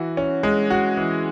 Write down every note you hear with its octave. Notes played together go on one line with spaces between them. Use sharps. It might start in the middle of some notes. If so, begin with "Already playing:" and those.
Already playing: E3 F#4
C#4
G#3
F#4
E3